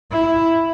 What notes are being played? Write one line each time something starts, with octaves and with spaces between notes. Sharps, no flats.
E4